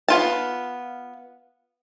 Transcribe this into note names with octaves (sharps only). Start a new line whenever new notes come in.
B3 F4 A5